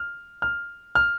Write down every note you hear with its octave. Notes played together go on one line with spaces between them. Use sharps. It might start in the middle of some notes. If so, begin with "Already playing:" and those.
Already playing: F6
F6
F6